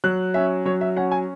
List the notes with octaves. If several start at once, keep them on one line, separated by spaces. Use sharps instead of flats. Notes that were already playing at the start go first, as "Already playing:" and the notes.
F#3 F#6
C#4 E5
F#3 C#5
E5
C#4 F#5
G#5